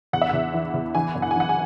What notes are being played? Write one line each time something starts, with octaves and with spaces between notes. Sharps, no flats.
E2 F#5
E5
E2 F#5
E3
E2
E3 G#5
F#2
F#5
G#5
E3 F#5
G#5